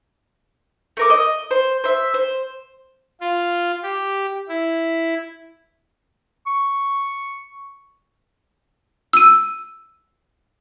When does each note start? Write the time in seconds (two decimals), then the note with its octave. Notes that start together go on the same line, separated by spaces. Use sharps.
0.97 A3 A#4 D6
1.10 D#5
1.51 C5
1.84 C5 E5
2.14 C5
3.20 F4
3.83 G4
4.49 E4
6.47 C#6
9.13 E6 D#7